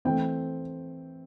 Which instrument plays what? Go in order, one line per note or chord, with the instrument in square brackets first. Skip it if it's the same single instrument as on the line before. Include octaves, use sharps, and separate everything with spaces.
[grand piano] E3 A3 C4 G5